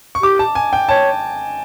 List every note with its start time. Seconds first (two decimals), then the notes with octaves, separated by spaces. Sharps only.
0.15 C#6
0.23 G4 D6
0.39 A5
0.55 G#5
0.73 G5
0.89 C#5 A5